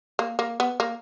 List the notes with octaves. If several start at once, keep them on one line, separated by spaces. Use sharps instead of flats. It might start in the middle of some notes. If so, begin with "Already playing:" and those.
A#3
A#3
B3
A#3